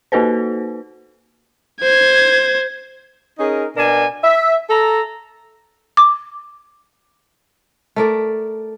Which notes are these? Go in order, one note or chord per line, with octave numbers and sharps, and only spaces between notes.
A#3 D#4 F#4 A4 B4 C5
C5 G#6
C#4 D#4 G#4 A#4
B2 D4 A#4 G#5
E5
A4 A#5
D6
A3 A#4 D5